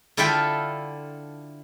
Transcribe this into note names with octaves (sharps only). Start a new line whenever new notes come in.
D3 E4 F4 A4 E5 G5